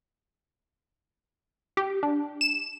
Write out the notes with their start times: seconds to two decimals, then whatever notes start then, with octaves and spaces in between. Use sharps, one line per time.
1.77 G4
2.03 D4
2.41 E7